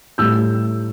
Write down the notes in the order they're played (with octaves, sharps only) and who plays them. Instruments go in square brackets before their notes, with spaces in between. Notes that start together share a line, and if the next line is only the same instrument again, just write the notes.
[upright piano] A2 G3 E6 G6